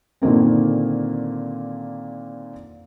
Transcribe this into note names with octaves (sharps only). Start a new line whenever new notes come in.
A#2 D3 D#3 A#3 C4